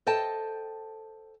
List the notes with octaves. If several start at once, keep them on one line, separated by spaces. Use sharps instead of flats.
A4 C5 D#5 G5 A5